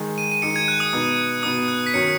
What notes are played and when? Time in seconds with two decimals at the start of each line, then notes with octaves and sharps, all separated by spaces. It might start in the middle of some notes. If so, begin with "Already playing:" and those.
Already playing: D#3 G#3 D#4
0.18 D#7
0.32 D#7
0.42 D#3 G#3 D#4 C#7
0.56 G#6
0.68 F#6
0.80 D#6
0.93 B2 B3 D#4
1.43 B2 B3 D#4 D#6
1.68 F#6
1.87 B6
1.94 D#3 F#3 C#4 C#7